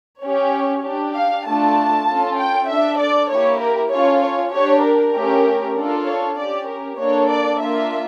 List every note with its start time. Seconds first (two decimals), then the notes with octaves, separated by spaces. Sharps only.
0.23 C#4 G4 C#5
0.84 D4 G4
1.15 F5
1.46 A3 D4 F4 A4 A5
2.07 C#4 F4 A4
2.38 G5
2.69 D4 A4 E5
2.99 D5
3.30 A#3 E4 G4 C#5
3.60 A#4
3.91 C#4 F4 A4 C#5
4.23 C#5
4.53 D4 G4 C#5
4.83 A#4
5.14 A3 C#4 G4
5.76 D4 F4 A4
6.06 C#5
6.37 C#4 G4 D5
6.68 A#4
6.98 A#3 D4 A4 C#5
7.30 D5
7.60 A#3 D4 F4 E5